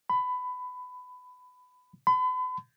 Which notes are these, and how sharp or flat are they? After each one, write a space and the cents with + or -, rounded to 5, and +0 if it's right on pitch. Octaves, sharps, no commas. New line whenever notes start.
B5 +20
B5 +40